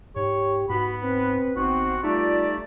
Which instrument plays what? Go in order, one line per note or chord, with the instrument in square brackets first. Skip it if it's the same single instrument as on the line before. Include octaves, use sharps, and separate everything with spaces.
[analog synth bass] G#2 [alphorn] G4 [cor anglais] C#5
[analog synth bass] G#2 [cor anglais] B3 [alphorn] F#4 [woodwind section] B5
[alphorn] C4 [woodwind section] B4
[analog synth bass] G#1 [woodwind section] B3 C4 [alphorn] D#4 [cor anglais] F#4
[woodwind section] G3 G4 D5 [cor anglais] A3 [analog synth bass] D#4 [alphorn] F4